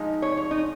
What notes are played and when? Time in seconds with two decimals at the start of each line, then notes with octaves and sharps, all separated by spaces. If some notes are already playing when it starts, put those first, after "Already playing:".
Already playing: F3 G#3 D#4
0.22 C#5
0.37 C#5
0.51 D#4